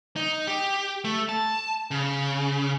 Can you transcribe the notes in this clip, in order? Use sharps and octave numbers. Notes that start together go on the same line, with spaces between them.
D#4
G4
A3
A5
C#3